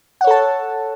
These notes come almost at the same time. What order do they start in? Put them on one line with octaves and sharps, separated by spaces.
F#5 C#5 A4 A5